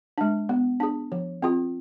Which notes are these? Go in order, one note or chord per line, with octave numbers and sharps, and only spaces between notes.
G#3 D4
B3
D4 G#4
F3
C4 F4 G#4